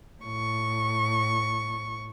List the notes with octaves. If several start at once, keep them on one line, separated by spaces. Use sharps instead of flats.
A2 C#6